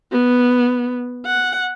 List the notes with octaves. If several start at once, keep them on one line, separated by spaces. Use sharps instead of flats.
B3
F#5